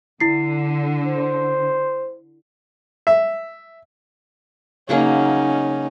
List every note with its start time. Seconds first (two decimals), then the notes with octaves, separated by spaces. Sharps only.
0.20 D3 E4 C7
1.06 C5
3.07 E5
4.89 C#3 F#3 A#3 C#4 D#4